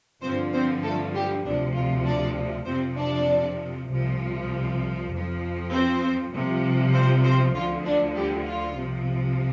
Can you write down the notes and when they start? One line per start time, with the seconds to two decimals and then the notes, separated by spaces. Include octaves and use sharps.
0.22 G2 D3 F3 C4 C5
0.52 C4 C5
0.83 A3 A4
1.14 G3 G4
1.44 D2 C3 F3 D4
1.75 F4
2.05 D4 D5
2.66 F2 C3 F3 C4 C5
2.96 D4 D5
3.88 C2 C3 F3
5.10 F2 F3
5.71 C4 C5
6.32 C2 C3 F3
6.93 C4 C5
7.24 C4 C5
7.54 D2 D3 F3 F4
7.85 D4
8.14 G3 G4
8.46 F4
8.76 C2 C3 F3